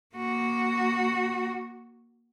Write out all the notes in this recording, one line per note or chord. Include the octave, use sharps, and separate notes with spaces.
A#3 F#4